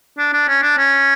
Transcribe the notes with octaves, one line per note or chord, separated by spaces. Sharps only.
D4
D4
C#4
D4
C#4